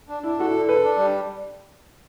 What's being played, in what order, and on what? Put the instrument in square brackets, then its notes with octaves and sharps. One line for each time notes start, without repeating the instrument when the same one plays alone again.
[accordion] D4
[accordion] D4 [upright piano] E4
[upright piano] F#4 [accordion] A4
[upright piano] E4
[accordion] D3
[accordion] A4 [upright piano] B4
[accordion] D4
G3